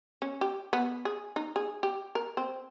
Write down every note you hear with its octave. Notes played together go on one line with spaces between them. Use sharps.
C#4
G4
B3
G#4
D#4
G#4
G4
A#4
C4